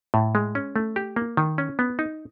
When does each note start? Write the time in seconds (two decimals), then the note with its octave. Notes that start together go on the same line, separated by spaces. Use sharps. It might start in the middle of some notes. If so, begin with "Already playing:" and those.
0.14 A2
0.35 G#3
0.55 C#4
0.76 A3
0.96 G4
1.16 A#3
1.37 D#3
1.58 C#4
1.79 B3
1.99 D#4